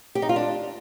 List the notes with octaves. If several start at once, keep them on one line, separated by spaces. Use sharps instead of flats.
G4
D#4
F4
D4